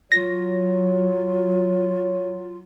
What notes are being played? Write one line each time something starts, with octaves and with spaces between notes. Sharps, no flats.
F#3 F4 C#5 A#6